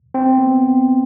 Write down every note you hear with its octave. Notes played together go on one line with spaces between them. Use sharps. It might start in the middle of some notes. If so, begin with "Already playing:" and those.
C4
B3